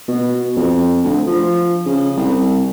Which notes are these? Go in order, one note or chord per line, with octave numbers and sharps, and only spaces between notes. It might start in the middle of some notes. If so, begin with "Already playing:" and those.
B2
F2
D2
F3
C#3
C2